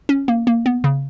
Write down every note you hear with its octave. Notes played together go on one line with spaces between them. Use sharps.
C#4
A#3
A#3
B3
C#3